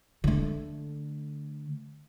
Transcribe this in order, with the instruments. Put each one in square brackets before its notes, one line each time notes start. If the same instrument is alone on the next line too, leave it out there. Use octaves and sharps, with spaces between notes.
[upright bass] D3 A3